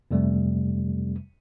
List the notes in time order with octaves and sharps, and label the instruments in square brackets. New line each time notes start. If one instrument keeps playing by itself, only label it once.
[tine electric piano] F2 C3 G3 A3